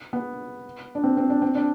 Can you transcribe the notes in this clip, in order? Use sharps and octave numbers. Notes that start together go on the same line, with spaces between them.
B3
D4
C4
C4
D4
C4
D4